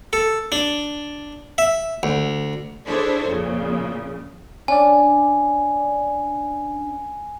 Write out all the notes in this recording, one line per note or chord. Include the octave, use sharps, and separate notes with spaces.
A4
D4
E5
D2
D4 E4 G#4 A4 C5 C#5
F2 A#2 C#3
C#4 D4 D5 G#5